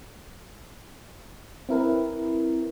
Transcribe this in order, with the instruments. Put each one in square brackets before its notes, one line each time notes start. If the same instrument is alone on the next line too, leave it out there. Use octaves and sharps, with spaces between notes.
[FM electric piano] C4 E4 A#4 B4